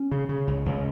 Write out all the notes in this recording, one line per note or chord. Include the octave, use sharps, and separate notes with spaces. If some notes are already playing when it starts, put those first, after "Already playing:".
Already playing: C#4
C#3
C#3
C#2
C#2